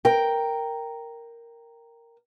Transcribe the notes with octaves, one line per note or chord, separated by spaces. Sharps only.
A#4 G5